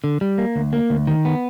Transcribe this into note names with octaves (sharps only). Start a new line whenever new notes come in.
D3
G3
A#3
D2
A#3
D2
D#3
B3